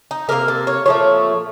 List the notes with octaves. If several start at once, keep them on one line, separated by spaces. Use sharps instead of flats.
D#4
C3 F#3 A#3 A#4
A4
C#5
A#2 F3 A3 C#5